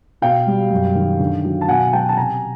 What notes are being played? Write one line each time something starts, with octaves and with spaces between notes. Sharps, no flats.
B2 F5 G5
G3
F#2
D#3
D3
F#3
A5
B2 F#5 G#5
F#3 G5 A5
A5
C3 G#5 A#5